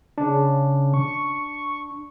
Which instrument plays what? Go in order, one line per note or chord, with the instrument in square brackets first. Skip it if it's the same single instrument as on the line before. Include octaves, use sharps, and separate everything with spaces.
[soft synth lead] C#3 [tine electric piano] D4
[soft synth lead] C#6